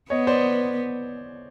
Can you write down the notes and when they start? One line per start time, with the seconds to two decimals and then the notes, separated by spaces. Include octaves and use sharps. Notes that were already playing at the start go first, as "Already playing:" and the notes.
0.10 B3 C#5 D#5
0.27 C5 D5